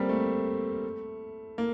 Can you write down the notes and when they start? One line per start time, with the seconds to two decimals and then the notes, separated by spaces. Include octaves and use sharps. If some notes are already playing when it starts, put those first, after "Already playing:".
Already playing: G3 A#3 C4 A4
0.09 A3
1.58 A#3